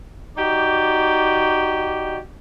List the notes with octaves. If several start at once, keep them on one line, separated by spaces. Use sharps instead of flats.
D#4 F#4 G4 D5